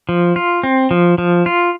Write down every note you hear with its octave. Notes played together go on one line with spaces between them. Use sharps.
F3
F4
C4
F3
F3
F4